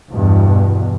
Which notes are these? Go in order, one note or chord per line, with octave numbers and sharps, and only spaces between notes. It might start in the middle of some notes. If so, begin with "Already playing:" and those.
E2 G2 B2